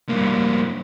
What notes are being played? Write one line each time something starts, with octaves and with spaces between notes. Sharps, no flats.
G2 A#3